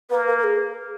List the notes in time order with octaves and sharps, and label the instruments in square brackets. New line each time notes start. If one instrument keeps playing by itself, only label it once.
[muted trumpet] A#3 [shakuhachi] B4
[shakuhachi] A#4
A#4
G#4